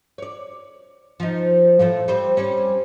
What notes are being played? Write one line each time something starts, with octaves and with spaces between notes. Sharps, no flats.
C#5 D5
F3 D#4
A2 F3 A3
G3 C4 C5
G3 C4 C#4